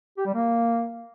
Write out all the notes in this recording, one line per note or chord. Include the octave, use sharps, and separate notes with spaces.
G4
G3
A#3